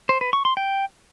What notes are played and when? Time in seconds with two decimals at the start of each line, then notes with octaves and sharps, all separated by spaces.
0.09 C5
0.21 B4
0.33 C#6
0.45 C6
0.57 G5